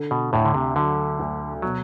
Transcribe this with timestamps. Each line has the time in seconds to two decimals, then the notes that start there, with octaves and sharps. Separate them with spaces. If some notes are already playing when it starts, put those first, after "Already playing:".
Already playing: D3
0.11 B2
0.33 D2 A2
0.45 D3
0.54 C3
0.76 D3 F#3
1.19 D2
1.62 B2 F#3